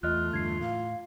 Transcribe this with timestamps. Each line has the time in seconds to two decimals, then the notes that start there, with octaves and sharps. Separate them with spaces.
0.03 E2 A3 F4 D#5 F6 F#6
0.33 E2 G2 D3 G#6 C7
0.61 A2 F5